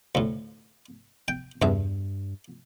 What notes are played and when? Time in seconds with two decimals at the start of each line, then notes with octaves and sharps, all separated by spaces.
0.15 D2 A2
1.28 G5
1.62 E2 G2 E5